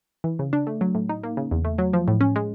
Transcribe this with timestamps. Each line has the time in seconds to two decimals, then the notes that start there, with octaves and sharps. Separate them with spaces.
0.24 E3
0.39 C#3
0.53 D4
0.67 A3
0.81 F#3
0.95 A2
1.09 D#4
1.24 A#3
1.37 C#3
1.51 E2
1.65 A3
1.78 F#3
1.93 F3
2.08 A2
2.21 C#4
2.36 G#3